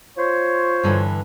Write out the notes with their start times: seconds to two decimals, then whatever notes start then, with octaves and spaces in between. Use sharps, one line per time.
0.17 F4 C5 C#5
0.83 G2 D3 E3